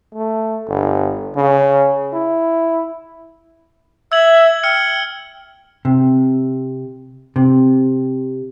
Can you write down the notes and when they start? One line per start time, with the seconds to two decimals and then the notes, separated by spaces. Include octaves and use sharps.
0.14 A3
0.67 G1
1.35 C#3
2.13 E4
4.12 E5 E6 G#6 F#7
4.63 G5 E6 F6 C#7
5.85 C3
7.36 C3